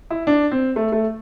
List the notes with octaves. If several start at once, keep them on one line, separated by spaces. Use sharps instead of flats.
E4
D4
C4
A3
A3